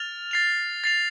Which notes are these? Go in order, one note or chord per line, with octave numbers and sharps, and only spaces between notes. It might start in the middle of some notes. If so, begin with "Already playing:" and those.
Already playing: F6 A6 F7
A6 C7 F7
A6 C7 F7